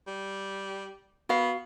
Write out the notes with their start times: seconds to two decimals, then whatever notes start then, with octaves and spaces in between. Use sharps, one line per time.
0.07 G3
1.29 B3 F#4 F5